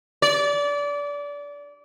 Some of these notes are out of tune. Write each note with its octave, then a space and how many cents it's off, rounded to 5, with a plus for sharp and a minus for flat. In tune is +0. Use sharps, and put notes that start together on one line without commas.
D5 -25